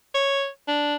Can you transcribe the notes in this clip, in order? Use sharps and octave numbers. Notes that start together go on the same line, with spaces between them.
C#5
D4